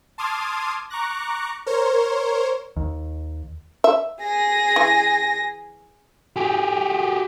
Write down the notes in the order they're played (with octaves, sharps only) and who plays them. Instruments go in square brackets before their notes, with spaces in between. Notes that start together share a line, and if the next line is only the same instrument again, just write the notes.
[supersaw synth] A5 C6 D6 D#6 F6 G#6
A#5 C#6 D6 F#6 A#6
A#4 C5 C#5
[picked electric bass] D#2
[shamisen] E5
[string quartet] G#4 A#6
[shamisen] E3 G#5
[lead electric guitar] G4 G#4